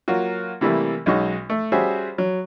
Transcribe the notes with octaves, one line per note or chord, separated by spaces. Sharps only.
F#3 A#3 F4 F#4
C3 E3 G3 A3 A#3
B1 G#3 C#4 D#4 F#4 C#6
A3
G3 C#4 F#4 G#4 C5 E5
F#3